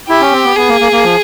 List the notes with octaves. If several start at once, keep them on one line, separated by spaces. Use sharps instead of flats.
E4 G4
C#4
C4
B3
B3 G#4
A#3
A#3
A#3
F3